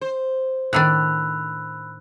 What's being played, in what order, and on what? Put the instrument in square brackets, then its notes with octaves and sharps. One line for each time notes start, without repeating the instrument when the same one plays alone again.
[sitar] C5
[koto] A2 D#3 D4 [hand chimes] B5 E6 F#6